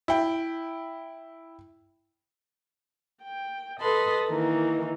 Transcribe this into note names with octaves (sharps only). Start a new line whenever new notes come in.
E4 G5
G5
A4 B4 D#5 B5 C6
D#3 E3 A#3 D#4